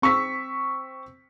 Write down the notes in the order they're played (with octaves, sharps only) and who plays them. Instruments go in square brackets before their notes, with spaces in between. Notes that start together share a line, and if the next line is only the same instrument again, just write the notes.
[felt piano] C4 C#6 E6 B6